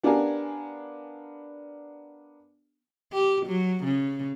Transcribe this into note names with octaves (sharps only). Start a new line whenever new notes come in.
B3 D4 G4 A#4 F5 G#5
G4
F#3
C#3